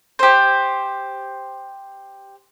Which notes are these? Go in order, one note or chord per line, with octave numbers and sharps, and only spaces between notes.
G4 C5